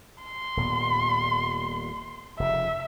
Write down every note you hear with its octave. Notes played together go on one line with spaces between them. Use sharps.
C6
D#1 A#2 B3
F1 C#3 E5